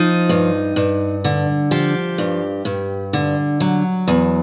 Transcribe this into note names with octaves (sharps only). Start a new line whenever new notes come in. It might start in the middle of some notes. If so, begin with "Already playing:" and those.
Already playing: F3 D#4
G2
G2
D3
F3 G4
G2
G2
D3
F#3
E2